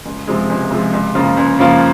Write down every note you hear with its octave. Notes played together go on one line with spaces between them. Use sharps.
C#2
C3 F3 G#3
C#2
C3 F3 G#3
C#2
C#3 F3 A#3 F4
C#2
C#3 F3 A#3 F4